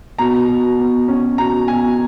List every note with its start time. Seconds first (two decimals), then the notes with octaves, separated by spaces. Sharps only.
0.19 B2 A#5
0.48 B2
0.79 B2
1.08 C#4
1.38 B2 A#5
1.68 B2 G#5